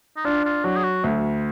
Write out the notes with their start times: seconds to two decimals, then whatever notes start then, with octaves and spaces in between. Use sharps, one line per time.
0.17 D#4
0.25 D4 F4
0.45 F4
0.64 F#3 F#4
0.77 G#4
0.84 F#4
1.04 D2